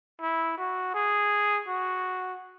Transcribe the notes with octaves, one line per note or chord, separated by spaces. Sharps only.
E4
F#4
G#4
F#4